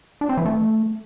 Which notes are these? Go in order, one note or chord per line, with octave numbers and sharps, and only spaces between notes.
D4
C4
E3
A3